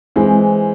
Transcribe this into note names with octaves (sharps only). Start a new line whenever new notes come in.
E3 G#3 C4